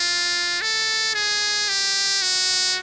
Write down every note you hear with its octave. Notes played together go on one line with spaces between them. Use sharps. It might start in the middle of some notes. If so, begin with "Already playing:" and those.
Already playing: F4
A4
G#4
G4
F#4